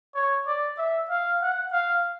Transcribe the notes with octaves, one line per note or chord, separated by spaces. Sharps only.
C#5
D5
E5
F5
F#5
F5